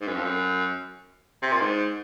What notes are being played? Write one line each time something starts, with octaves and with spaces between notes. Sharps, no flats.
G#2
F#2
F2
F#2
C3
A#2
G#2